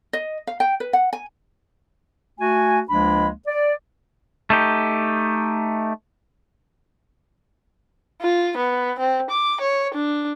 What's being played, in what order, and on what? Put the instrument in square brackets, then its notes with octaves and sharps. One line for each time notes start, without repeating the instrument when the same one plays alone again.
[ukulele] D#5
F5
G5
B4
F#5
G#5
[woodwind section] A3 F#4 G#5
C#2 F3 G#3 A#3 D4 B5
D5
[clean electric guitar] A3 D#4 G4
[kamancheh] F4
B3
C4
D6
C#5
D4